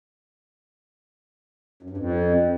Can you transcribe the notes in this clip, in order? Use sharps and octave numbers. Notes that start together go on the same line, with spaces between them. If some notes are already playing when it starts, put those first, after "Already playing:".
F#2
G2
F2